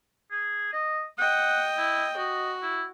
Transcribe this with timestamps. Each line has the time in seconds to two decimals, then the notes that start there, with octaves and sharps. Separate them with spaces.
0.31 G#4
0.73 D#5
1.18 D#5 F#5 G5
1.77 E4
2.17 F#4 D#5
2.62 E4